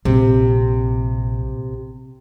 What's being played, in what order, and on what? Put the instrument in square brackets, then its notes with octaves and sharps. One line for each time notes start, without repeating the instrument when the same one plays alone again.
[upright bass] A#1 [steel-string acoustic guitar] C3